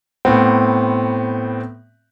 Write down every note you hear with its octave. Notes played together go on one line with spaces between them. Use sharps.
A2 B3 C4